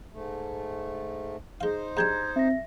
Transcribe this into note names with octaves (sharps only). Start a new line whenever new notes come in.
G#2 A3
G#3 D#4 C5 F5
G#2 G3 D4 A#5 G6 G#6
C4 E5 A#6